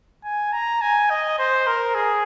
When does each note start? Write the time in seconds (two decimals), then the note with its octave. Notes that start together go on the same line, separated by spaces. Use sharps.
0.24 G#5
0.53 A#5
0.82 G#5
1.10 D#5
1.39 C5
1.67 A#4
1.95 G#4